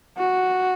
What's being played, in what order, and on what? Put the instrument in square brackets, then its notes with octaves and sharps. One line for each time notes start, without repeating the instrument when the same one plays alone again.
[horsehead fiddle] F#4